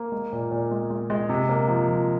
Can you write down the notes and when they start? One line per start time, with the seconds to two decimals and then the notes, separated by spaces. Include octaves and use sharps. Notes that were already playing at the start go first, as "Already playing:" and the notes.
Already playing: A#3
0.12 G#3
0.32 A#2
0.51 A#2
0.71 G#3
0.90 G#3
1.10 G#3
1.29 C3
1.49 A#3
1.68 F3
1.88 F3